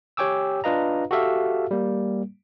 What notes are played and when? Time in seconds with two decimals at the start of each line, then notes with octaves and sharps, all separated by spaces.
0.17 G4 C#5 G5 G#5 D6 E6
0.64 D4 F4 B4 D#5 F5 A#5
1.11 F#4 G4 A4 E5 F5
1.71 G3 A#3